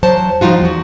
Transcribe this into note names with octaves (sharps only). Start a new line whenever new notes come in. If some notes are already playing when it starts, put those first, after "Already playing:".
E2 F#3 C5 A5
F3 G3 D#4 F4 F#4
E2 F#4